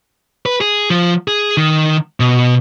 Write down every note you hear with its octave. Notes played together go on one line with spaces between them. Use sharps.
B4
G#4
F3
G#4
D#3
B2